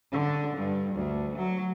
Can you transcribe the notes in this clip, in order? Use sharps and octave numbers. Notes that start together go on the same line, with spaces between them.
D3
G2
D2
F#3